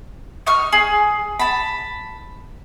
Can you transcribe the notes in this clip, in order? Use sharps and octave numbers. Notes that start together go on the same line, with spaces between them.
D#4 C#6 F6
G#4
A5 B5